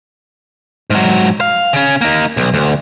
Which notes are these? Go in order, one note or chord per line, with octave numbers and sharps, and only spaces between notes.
G#2 F#3
F5
C#3 C#4
A#3 D#4
B1
D2